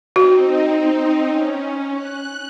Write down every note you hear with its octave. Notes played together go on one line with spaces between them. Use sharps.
C4 D#4 F#4
C#4
F#6